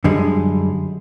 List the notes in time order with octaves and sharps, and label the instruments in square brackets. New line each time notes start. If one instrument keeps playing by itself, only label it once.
[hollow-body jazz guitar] F#2 D3 G3 G#3